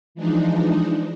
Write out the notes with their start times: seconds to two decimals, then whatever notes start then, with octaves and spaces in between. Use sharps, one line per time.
0.15 E3 F3 G#3 D4 D#4